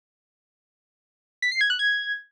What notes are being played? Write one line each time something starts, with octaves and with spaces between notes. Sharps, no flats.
B6
C7
G#6
F#6
G#6